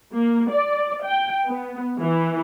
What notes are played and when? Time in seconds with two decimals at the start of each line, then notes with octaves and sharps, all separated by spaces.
0.13 A#3
0.51 D5
1.05 G5
1.47 B3
2.00 E3